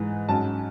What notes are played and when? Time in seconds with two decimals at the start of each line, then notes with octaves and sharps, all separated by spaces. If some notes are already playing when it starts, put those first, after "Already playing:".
Already playing: G#2 E3 G#3
0.29 G#2 F#3 C#4 A5